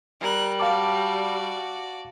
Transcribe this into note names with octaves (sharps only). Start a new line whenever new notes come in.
G3 A#4 F#6
F#4 D5 F5 A5 D6